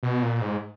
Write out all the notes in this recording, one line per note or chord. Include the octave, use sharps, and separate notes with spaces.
B2
A#2
G#2